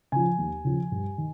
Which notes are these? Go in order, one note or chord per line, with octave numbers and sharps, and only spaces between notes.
C#3 F3 G#5
D#2
C#3 F3
G2
D#3